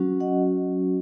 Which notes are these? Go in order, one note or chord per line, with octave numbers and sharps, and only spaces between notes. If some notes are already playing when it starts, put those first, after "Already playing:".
Already playing: F#3 C#4 F#4
D#5 F#5